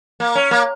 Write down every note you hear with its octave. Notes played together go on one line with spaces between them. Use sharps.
A#3
C#4
A#3